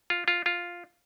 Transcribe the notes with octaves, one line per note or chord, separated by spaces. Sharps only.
F4
F4
F4